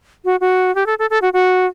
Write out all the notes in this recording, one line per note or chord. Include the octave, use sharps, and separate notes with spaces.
F#4
F#4
G4
A4
A4
A4
F#4
F#4